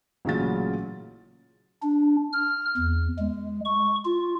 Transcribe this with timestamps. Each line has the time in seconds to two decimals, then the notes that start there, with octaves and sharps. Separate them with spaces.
0.25 A1 A#2 C#3 F#3 F4 A6
1.82 D4
2.33 F6
2.77 E2
3.19 G#3
3.65 C#6
4.05 F4